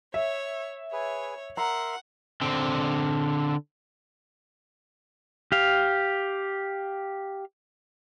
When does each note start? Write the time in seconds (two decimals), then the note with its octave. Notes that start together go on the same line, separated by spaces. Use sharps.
0.14 C#5 E5
0.92 G#4 B4 C#5
1.57 A#4 E5 F#5 A#5 C6
2.41 D3 C4
5.52 G4 F5